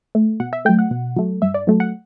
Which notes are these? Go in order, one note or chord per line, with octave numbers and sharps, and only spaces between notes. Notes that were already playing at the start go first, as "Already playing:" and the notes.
A3
B2 F#5
E5
F#3 A3 G5
F#5
B2
F#3 A3
G2 E5
D5
F#3 A3
F#5